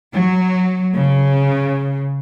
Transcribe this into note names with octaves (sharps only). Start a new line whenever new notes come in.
F#3
C#3